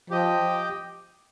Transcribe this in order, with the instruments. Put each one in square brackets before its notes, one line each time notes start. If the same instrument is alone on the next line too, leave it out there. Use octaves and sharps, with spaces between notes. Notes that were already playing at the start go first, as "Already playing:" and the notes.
[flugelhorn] F3 [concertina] G4 D#5 G5